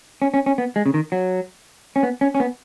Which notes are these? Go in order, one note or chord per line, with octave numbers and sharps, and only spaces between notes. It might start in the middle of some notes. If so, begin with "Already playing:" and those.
C#4
C#4
C#4
B3
G#3
C#3
D#3
F#3
C#4
B3
C#4
C#4
B3